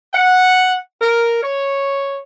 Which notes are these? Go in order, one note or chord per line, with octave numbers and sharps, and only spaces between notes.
F#5
A#4
C#5